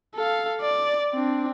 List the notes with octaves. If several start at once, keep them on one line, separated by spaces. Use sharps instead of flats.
A4 F5
D5
C4 D4